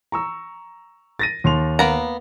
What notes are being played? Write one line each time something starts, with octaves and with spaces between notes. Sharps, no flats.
A#5 C#6 E6
A6 A#6 D#7
D#2 C6 F7
A#3 B3 A#5